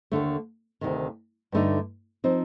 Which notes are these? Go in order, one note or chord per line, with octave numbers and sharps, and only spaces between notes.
D#2 D3 A3
D2 C3 D#3
G2 D3 A3 D#4
F3 C4 D#4